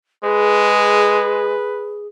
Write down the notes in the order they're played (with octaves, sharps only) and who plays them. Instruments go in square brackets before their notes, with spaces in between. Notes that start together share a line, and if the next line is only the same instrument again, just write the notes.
[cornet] G#3 [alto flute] G#4 [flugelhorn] B4